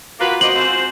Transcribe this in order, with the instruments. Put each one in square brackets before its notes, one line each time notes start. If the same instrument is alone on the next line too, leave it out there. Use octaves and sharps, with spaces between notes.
[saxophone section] A#3 B4 [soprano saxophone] F4 [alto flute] F#4
[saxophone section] A#3 D5 D#5 [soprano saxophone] C5 [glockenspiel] F#7
[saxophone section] G#3 F4 C5 [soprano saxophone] C4